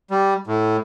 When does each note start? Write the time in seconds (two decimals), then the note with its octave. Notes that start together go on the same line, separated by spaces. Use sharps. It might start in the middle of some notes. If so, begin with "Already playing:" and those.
0.11 G3
0.47 A2